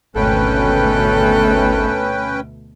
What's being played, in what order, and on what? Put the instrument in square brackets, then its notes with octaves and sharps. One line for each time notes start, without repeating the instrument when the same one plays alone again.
[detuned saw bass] G#1 [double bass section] D2 B2 A3 [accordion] C#4 B4 G5 [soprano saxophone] A4